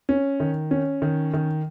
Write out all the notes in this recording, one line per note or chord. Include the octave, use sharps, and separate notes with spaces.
C#4
D#3
C#4
D#3
D#3